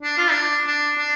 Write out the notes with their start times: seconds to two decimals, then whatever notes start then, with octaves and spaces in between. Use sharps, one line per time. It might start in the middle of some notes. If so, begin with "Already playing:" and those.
0.02 D4
0.18 F4
0.31 D4
0.67 D4
0.98 D4